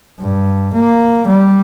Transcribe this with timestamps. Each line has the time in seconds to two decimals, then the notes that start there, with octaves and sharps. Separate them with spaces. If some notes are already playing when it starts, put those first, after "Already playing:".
0.20 G2
0.74 A#3
1.28 G3